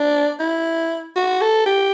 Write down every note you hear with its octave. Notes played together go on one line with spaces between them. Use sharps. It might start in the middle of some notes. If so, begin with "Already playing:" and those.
Already playing: D4
E4
F#4
A4
G4